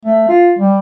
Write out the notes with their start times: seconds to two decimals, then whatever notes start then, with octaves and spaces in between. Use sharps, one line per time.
0.05 A3
0.29 F4
0.59 G3